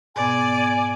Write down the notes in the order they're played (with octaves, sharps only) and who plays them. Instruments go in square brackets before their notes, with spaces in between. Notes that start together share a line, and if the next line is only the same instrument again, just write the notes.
[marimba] G#2 B2 B3 [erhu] D5 [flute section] G#5